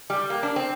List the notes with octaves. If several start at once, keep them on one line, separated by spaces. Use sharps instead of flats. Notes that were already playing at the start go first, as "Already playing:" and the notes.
G3
A#3
D4
C4